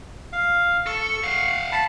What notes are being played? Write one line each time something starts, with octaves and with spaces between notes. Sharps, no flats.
F5
A4 C#6
F5 F#5
A5 B5